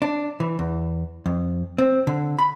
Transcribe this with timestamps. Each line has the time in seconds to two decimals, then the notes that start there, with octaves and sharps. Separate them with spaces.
0.02 D4
0.40 E3
0.59 E2
1.26 F2
1.78 C4
2.07 D3
2.39 B5